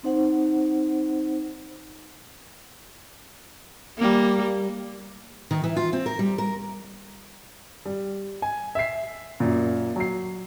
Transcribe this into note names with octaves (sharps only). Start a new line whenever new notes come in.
C4 D#4 C5 F#5
G3 A#3
D#3
E3
F4
C4
A#4
G3
A#4
G3
G#5
E5 C7
F#2 A#2
F#3 C7